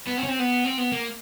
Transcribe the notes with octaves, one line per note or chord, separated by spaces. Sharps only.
B3
C4
C#4
C4
B3
C4
B3
A#3